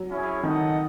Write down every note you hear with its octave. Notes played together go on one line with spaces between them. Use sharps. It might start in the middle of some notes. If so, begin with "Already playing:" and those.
Already playing: F#3
C#4 E4 G#4 C#5
D#3 D#4 A4 D#5 F#5